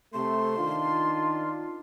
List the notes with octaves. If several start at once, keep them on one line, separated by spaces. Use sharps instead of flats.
C3 A3 C6
D#3 D4 F4